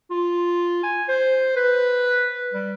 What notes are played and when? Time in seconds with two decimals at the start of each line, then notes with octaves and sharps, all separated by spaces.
0.11 F4
0.83 G#5
1.08 C5
1.56 B4
2.54 G3